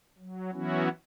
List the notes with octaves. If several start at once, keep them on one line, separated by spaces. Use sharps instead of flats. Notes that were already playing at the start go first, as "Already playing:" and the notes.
F#3
E3 F#3 B3 C#4 E4 F#4